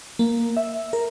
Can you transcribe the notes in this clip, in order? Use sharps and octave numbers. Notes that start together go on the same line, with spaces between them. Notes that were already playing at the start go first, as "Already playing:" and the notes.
A#3
E5
A#4